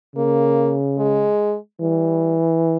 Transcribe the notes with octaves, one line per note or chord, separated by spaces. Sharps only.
C#3 A#3
G#3
E3 G3